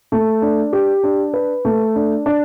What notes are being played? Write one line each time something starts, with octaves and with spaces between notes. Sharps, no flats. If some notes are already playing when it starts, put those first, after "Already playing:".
A3
D4
G4
D4
B4
A3
D4
D4